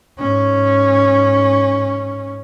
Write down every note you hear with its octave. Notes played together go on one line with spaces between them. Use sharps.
G#2 C#4